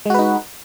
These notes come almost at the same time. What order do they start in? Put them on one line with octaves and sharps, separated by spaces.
G#3 F#4 B4 D#4